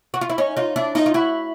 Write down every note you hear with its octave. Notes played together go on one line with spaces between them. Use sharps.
F#4
F4
E4
C#4 D#4
D#4 F4
D4 E4
D#4 F4
F4
E4 F#4